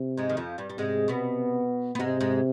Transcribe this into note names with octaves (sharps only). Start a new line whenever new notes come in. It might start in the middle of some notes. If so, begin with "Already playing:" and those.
Already playing: C3
G#2 G#3
D#3
F2 F3
G2 G3
G3
G#2 C3 G#3
B2 B3
B3
G#2 C3 G#3
G#2 G#3